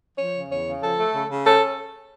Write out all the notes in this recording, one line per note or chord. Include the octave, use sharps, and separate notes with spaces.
F3 C#5
C#3
E2 C#5
C#3
F3 A4
A3
C#3
C#3
C#4 A4